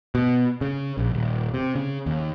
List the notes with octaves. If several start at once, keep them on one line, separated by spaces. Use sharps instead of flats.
B2
C#3
A#1
D#1
C3
C#3
D#2